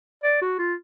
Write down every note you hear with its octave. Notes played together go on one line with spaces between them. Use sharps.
D5
F#4
F4